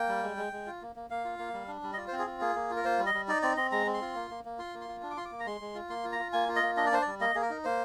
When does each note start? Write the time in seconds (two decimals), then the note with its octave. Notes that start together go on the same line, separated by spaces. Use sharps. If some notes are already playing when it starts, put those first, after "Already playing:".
Already playing: A#3 G5
0.08 G3
0.23 G#3
0.37 G#3
0.53 G#3
0.66 F4
0.81 A#3
0.96 A#3
1.10 A#3 F5
1.25 F4
1.39 A#3
1.54 G3
1.68 D4
1.83 G3
1.93 D#5
1.97 F4 D5
2.08 C5
2.13 C4
2.19 G#4
2.27 F4
2.41 A#3 G#4
2.55 A#3
2.70 F4
2.76 A#4
2.84 A#3 C5
2.99 G3
3.06 D#5
3.14 G3
3.28 D#4 D5
3.42 C4 D5
3.57 C4 D#5
3.72 G#3 A#5
3.86 C4
3.94 C6
4.02 F4
4.15 A#3
4.31 A#3
4.45 A#3
4.58 F4 C6
4.74 A#3
4.81 C6
4.89 F4
5.02 D4
5.11 D6
5.17 F4 C6
5.25 D6
5.32 A#3
5.40 A#5
5.46 G#3 C6
5.61 G#3
5.75 F4
5.89 A#3 C6
6.05 F4
6.12 A#5
6.19 F4
6.33 A#3 G#5
6.48 F4
6.56 D#5
6.63 A#3
6.77 D4 D#5
6.86 D5
6.92 D4 C5
7.02 G3 D5
7.21 A#3 D#5
7.35 A#3 G#4
7.42 A#4
7.50 D#4
7.65 A#3 C5